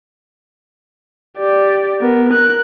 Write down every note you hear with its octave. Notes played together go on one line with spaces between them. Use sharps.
G4 D5
B3 A#4
A#4 F#6